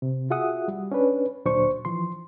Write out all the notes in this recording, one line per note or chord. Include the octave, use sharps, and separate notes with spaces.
C3
F4 F#4 G#4 E5 F#5 D#6
G3
C#4 D4 B4
D2 A#2 F#3 D4 C5 C#6
E3 F3 C6